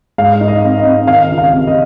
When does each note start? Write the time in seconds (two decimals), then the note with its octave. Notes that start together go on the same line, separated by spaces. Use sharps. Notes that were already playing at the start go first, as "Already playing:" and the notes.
0.18 G#2 F5
0.41 D#4
0.48 D#5
0.64 C4
0.78 D#5
0.86 C4
1.07 D#3 F5
1.31 C#2
1.38 F5
1.53 C3
1.67 D#5